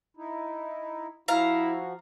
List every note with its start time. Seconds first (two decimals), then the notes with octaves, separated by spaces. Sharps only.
0.17 D#4 E4
1.28 F3 E4 F#4 F5 A#5